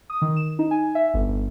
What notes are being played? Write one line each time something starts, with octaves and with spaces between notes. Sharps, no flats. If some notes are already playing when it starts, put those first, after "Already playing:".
D#6
D#3
E7
D#4
G#5
E5
G1
G1